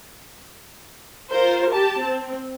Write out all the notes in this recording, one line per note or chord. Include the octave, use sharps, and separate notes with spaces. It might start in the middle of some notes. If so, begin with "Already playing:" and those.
F4 A#4 C5
G4 A5
C4